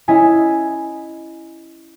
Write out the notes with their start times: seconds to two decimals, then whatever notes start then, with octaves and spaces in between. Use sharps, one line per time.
0.08 C#4 E4 D#5 E5 G#5